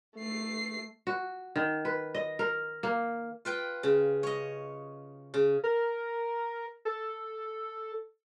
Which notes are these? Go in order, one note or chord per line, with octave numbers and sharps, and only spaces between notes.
A3 C7
F#4
D#3
B4
D#5
A#4
A#3
F4 B4 G5
C#3
C#5 D#5
C#3
A#4
A4